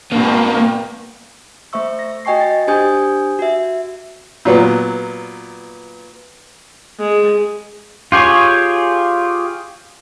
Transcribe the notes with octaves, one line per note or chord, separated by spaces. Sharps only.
G2 A#2 A#3 B3
A3 C5 E5 C#6 E6
A#6
F#4 D#5 G5 G#5 C#6 C7
D#5 G6 A6
D4 G4 C5 G#5 D#6 G6
F#4 E5
A#2 F#3 B3
G#3
F4 G4 G#4 C#5